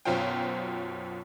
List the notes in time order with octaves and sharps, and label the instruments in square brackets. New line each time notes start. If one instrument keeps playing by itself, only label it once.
[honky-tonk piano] B1 F#2 B2 F4 C5 G5